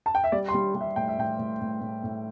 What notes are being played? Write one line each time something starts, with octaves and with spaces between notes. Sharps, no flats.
A5
G5
E5
G3 D5
C6
G3
G3
E5
A2 G5
E5
A2 G5
A2
A2
A2
A2